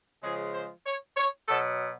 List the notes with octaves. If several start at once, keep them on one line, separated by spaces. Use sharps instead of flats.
C#3 F3 G#3 G#4
C5
C#5
C#5
B2 F#3 A4